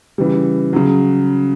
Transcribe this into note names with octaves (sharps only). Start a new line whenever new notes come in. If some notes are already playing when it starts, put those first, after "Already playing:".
C#3 E3 G3
C#3 F#3